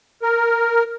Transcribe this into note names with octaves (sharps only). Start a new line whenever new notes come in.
A#4